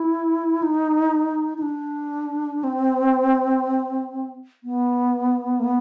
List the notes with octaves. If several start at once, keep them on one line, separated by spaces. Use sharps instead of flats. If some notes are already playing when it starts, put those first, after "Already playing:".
Already playing: E4
D#4
D#4
D4
C4
B3
A#3
B3